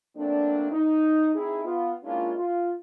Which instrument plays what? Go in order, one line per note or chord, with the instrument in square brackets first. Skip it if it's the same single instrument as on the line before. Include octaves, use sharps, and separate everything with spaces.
[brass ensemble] F#3 A3 A#3 C4 D4
D#4
C4 D#4 E4 G#4
B3 F4
G#3 A#3 C#4 D4 E4 F4
F4